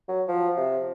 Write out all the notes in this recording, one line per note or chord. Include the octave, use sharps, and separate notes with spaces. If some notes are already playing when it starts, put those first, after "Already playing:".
F#3
F3
C3